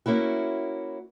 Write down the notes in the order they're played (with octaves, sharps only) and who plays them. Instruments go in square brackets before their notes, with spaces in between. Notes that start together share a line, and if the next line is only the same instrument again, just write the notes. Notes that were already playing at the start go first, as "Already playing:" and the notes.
[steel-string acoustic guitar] A#3 C#4 E4 F#4